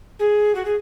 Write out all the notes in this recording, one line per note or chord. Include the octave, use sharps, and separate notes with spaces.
G#4
F#4
G#4